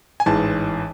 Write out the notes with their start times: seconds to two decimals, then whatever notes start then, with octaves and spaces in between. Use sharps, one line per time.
0.20 G#5
0.26 A1 G#2 E3 A5